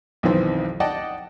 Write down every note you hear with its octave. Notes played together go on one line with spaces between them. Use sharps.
B1 F2 D#3 E3 C4
D5 D#5 F#5 G5 A5